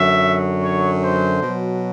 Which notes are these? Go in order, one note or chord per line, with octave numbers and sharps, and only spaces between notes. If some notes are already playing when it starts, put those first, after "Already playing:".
Already playing: F#2 D3 F#3 E5
C#5
C5
B2 F#3